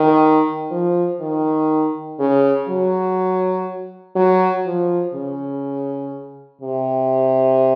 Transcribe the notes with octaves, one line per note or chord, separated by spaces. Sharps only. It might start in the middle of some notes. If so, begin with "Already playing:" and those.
Already playing: D#3
F3
D#3
C#3
F#3
F#3
F3
C#3
C3